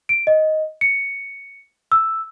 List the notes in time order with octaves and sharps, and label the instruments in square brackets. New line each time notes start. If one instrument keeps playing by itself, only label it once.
[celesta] D7
D#5
C#7
E6